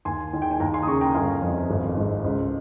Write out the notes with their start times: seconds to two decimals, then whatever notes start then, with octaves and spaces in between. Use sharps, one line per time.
0.05 D#2 G#5 C6
0.33 D#3
0.42 G5
0.51 G#5
0.60 D#2 G5 A#5
0.74 G#5 C6
0.83 D#6
0.87 C#3 A#5 C#6
1.01 G5 A#5
1.15 G1 F5 G#5
1.42 F2
1.70 G#1
1.97 G#2
2.24 C#2